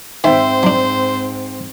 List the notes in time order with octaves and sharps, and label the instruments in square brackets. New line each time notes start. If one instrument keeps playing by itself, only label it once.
[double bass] G#2 C4 [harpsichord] D#3 G#5 [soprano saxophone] C5 [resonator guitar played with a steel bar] E5 G5
[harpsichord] F#3 D4